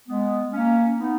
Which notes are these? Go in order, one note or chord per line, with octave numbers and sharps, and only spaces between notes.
G#3 B3
A#3 C#4
B3 D#4